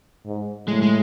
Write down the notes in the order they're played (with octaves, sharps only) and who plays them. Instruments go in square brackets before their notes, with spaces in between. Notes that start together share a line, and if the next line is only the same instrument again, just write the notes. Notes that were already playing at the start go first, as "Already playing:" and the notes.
[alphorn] G#2
[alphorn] A2 [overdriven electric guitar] G#3
[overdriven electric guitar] G#3